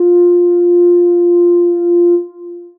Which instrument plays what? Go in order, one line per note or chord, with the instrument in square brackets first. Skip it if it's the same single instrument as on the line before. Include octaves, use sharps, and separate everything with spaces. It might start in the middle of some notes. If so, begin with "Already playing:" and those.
Already playing: [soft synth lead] F4